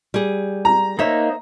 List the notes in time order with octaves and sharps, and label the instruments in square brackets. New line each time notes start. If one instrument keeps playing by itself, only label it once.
[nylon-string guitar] G3 G#4
[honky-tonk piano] A#5
[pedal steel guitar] A#3 D#4 [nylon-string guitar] C5 C#5 E5